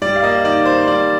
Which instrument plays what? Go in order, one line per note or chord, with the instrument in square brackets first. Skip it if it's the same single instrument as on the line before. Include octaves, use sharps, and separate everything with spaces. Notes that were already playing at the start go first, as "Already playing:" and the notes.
[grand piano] G3 D5
F5
A#3 D#5
D#3 D5
D#3 C5
G3 D5